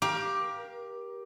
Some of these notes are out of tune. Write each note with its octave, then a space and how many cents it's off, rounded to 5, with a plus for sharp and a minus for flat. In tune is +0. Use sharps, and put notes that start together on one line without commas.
G4 +0 A#4 +30 F5 +0